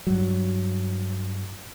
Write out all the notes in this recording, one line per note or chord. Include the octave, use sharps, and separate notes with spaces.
G2 F#3